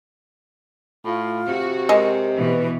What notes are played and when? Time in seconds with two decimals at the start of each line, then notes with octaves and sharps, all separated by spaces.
1.05 A2 F4
1.48 C3 F#4
1.89 G#3 A#4
2.37 B2 E3 B4